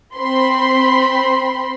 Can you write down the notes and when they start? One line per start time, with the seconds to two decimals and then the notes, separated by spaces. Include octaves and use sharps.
0.17 C4 B5 C6